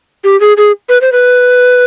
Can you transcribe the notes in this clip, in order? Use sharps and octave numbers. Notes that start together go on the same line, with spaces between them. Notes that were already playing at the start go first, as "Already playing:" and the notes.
G4
G#4
G#4
B4
C5
B4